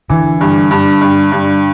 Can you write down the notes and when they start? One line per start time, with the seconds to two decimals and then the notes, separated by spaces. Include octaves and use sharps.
0.09 D3 E3
0.41 G2
0.71 G2
1.01 G2
1.32 G2